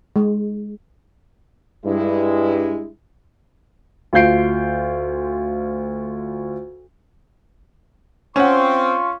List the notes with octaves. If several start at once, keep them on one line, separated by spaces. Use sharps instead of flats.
G#3
G2 G#3 E4
D2 F4 F5 G6 C7 D7
C4 C#4 F4 F#5 C6 C#6